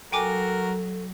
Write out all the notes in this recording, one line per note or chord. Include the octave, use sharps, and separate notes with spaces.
F#3 F#4 A4 A#4 G5 G#5 D6